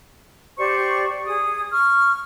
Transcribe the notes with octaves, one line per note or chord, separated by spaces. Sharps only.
G4 C5 D5 C#6
G#4 D#6
C#6 F6